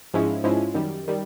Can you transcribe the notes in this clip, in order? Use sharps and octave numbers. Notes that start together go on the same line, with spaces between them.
G#2 F3 G#3 C#4 E4
G#2 F3 G#3 C#4 E4
F#2 D#3 G3
D#3 G3